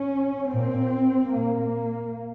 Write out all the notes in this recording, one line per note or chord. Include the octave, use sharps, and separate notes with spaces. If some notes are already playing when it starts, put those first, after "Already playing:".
Already playing: C#4
A#2 C4
A#2 A#3